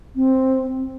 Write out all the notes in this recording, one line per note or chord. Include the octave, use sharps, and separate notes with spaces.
C4